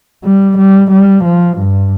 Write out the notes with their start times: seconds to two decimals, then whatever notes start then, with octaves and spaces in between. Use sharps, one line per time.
0.24 G3
0.58 G3
0.91 G3
1.24 F3
1.58 G2